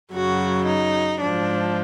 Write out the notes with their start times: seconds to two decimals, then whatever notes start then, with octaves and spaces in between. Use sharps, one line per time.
0.13 F#2 C#3 F#3 F#4
0.66 D#4
1.19 G#2 F3 D4